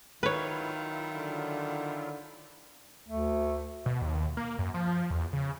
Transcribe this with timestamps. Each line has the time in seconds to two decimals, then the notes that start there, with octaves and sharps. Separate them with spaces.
0.23 D#3 F#3 E4 F4 B4 C#5
1.16 D3
3.09 D2 A3
3.86 B2
4.02 D#2
4.37 A#3
4.59 F#2
4.74 F3
5.11 E2
5.33 C#3